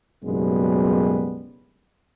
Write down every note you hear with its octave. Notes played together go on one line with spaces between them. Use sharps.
F#1 B1 F#2 G3 G#3 B3